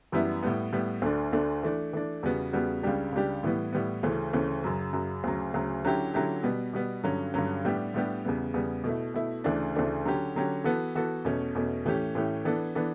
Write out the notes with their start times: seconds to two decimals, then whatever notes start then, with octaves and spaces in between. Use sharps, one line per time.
0.12 F#2 E3 G3 B3 E4
0.43 A2 G3 B3
0.72 A2 G3 B3
1.02 D2 D3 A3 D4
1.32 D2 D3 A3 D4
1.63 E3 A3 D4
1.93 E3 A3 D4
2.23 E2 C#3 G3 B3 F#4
2.53 E2 C#3 G3 B3 F#4
2.83 C#2 C#3 G3 D4 G4
3.12 C#2 C#3 G3 D4 G4
3.43 A2 E3 G3 B3
3.73 A2 E3 G3 B3
4.03 D2 C#3 E3 A3 C#4
4.33 D2 C#3 E3 A3 C#4
4.64 F#2 C#3 F#3
4.93 F#2 C#3 F#3
5.24 D2 C#3 F#3
5.54 D2 C#3 F#3
5.84 D3 F#3 C#4 E4 G4
6.14 D3 F#3 C#4 E4 G4
6.43 B2 G3 B3
6.73 B2 G3 B3
7.04 G2 D3 F#3 C#4
7.34 G2 D3 F#3 C#4
7.65 A2 G3 B3 D4 G4
7.94 A2 G3 B3 D4 G4
8.25 E2 C#3 G3 B3
8.54 E2 C#3 G3 B3
8.84 B2 A3 E4
9.14 B2 A3 E4
9.44 D2 C#3 E3 A3 D4
9.75 D2 C#3 E3 A3 D4
10.05 D3 F#3 C#4 G4
10.35 D3 F#3 C#4 G4
10.64 E3 B3 F#4 A4
10.95 E3 B3 F#4 A4
11.25 E2 B2 A3 C#4
11.55 E2 B2 A3 C#4
11.85 A2 E3 A3 C#4 G4
12.15 A2 E3 A3 C#4 G4
12.45 E3 B3 D4 A4
12.75 E3 B3 D4 A4